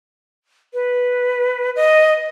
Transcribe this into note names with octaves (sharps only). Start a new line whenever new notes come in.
B4
D#5